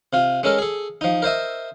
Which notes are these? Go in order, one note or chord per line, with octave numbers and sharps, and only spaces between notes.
C3 F4
G#3 C#4 A4 A#4
G#4 A4
F3 D#4
A#4 C5 D#5 E5